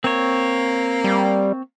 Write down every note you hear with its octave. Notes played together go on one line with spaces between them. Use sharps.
A#3 C4 C#5
G3